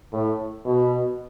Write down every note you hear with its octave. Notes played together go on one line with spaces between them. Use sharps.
A2
B2